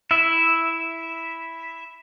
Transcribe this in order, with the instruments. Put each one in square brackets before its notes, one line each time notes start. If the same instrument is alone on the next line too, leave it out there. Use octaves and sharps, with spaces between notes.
[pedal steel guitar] E4 E5